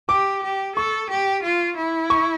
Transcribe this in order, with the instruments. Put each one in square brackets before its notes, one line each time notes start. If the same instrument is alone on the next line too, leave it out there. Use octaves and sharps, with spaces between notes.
[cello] G4 [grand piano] D6
[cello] G4
[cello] A4 [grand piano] C#6
[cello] G4
F4
E4
[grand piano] C#6